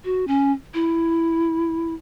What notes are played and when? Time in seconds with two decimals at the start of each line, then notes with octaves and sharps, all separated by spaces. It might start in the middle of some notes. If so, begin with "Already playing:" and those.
0.05 F#4
0.28 C#4
0.74 E4